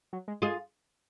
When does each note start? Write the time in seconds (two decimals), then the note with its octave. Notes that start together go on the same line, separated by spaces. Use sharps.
0.13 F#3
0.28 G#3
0.42 G#3 F4 G#4